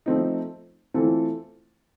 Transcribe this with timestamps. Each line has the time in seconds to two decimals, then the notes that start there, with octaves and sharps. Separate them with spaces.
0.06 F3 A3 C4 D#4
0.94 E3 A3 C4 F4 A4